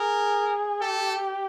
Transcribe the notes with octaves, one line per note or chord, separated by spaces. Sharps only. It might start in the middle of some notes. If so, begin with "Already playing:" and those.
Already playing: G#4 A#4
G4 A4